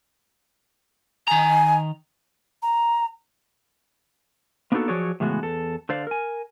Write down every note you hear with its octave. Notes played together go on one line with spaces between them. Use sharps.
D#3 G#5 A#5
A#5
A#3 B3 D4 D#4 F#4 A4
F3 F#3 F#4 G#4 C#5 D5
A2 C#3 E3 G#3 B3 F#4
E2 A4
D3 C5 D5 F5
A#4 G#5